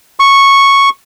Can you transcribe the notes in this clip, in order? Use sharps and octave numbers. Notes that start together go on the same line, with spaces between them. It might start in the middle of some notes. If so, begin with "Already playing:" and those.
C#6